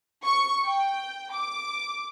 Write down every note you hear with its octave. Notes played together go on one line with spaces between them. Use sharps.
C#6
G5
D6